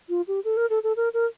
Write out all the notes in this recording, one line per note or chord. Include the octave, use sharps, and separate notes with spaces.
F4
G4
A4
A#4
A4
A4
A#4
A#4